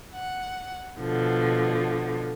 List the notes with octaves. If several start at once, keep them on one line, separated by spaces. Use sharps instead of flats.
F#5
B2 D3 F3